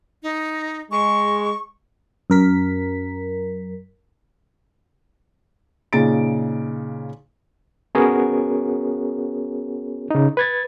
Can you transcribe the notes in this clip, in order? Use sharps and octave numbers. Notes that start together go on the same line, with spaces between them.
D#4
G#3 C#6
F#2 A#4 B6
A#2 C#3 D#4 A6 D7
B3 C#4 F#4 G#4 A#4 C#5
C#3 D#4
B4 G#6 A6